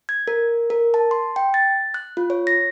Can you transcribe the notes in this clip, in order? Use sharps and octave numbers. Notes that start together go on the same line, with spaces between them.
G#6
A#4
A#4
A5
C6
G5
A6
F#6
F4
C#5
A#6